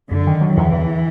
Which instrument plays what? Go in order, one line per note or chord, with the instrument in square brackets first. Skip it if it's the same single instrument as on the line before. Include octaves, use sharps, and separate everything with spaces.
[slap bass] F#2 [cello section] D3
[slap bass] D#3
F#3
[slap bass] E2 [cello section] E3
[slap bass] E2